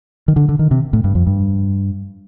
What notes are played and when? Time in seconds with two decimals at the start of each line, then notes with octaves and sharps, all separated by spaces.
0.28 D#3
0.36 D3
0.49 D3
0.59 D#3
0.71 C3
0.93 A2
1.04 G2
1.15 F2
1.27 G2